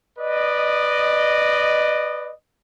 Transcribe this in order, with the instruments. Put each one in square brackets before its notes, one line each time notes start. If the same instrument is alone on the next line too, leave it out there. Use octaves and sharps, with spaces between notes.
[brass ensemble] B4 D5 D#5